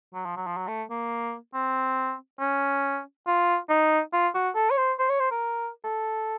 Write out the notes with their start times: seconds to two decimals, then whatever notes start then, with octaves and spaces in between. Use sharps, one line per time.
0.14 F#3
0.25 F3
0.37 F#3
0.47 F3
0.57 F#3
0.68 A3
0.90 A#3
1.54 C4
2.40 C#4
3.27 F4
3.69 D#4
4.13 F4
4.34 F#4
4.55 A4
4.70 C#5
4.77 C5
4.99 C5
5.09 C#5
5.20 C5
5.31 A#4
5.84 A4